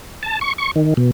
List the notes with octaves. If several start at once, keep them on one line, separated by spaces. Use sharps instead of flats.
A5
C#6
C#6
D#3
B2